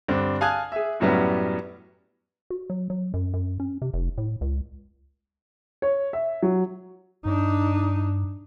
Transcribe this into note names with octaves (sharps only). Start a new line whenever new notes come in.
G2 D3 C4 D4
F5 G#5 A5 D#6 F#6 G#6
G#4 E5
F#2 A2 F#3 G3 B3 C#4
F#4
F#3
F#3
F#2
F#2
C#4
C3
F1
A2
C#2
C#5
E5
F#3
G2 D4 D#4